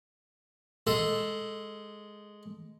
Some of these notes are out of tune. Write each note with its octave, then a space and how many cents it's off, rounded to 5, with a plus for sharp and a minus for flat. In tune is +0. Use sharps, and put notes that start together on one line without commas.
G#3 +0 A4 +0